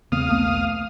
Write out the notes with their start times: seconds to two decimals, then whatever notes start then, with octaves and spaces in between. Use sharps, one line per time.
0.12 E2 C#3 A#3 C4 F5 D#6
0.27 B1 A3 B3